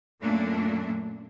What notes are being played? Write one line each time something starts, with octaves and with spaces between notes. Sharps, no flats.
F#2 A#2 A3 A#3 D4